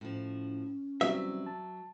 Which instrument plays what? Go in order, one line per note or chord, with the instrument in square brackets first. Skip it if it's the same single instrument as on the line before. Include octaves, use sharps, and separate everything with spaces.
[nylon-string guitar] A2 F3 [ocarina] C#4
[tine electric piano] E3 G3 C4 [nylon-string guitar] F#3 [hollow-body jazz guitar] E5
[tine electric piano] A5